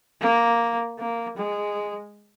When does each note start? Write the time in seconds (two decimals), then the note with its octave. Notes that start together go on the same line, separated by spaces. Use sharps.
0.21 A#3
0.99 A#3
1.37 G#3